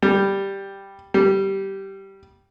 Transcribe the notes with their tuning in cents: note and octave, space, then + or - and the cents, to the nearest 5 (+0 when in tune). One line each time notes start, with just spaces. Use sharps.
G3 +0
G3 -15